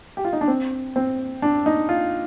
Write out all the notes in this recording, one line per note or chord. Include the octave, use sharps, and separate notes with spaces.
G4
F4
D#4
D4
C4
C4
D4
D#4
F4